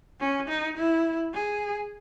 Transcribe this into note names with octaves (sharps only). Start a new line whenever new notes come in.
C#4
D#4
E4
G#4